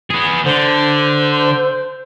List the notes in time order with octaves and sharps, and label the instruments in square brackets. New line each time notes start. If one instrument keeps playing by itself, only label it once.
[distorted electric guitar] B3 G#4
[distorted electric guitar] D3 [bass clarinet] C5